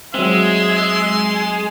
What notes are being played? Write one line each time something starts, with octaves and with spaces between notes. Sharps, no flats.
F#3 G#3 C4 E5 C6